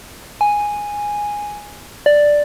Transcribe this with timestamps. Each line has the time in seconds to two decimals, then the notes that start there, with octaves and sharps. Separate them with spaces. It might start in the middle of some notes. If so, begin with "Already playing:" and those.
0.41 G#5
2.06 D5